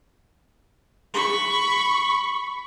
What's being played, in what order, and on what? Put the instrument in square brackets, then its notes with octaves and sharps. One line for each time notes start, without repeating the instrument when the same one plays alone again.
[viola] B5 C#6